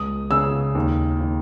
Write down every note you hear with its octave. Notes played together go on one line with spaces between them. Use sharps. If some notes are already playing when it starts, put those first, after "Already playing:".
Already playing: C#2 D#6
C#3 E6
D#2
D#3